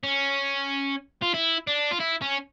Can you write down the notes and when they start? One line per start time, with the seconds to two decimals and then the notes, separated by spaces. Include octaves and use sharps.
0.04 C#4
1.22 F4
1.34 E4
1.67 D4
1.91 F4
2.00 E4
2.22 C#4